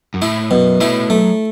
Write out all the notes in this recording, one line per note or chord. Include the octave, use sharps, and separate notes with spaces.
F#2
A2 E4
F#2 B2
A2 E4
F#2 A3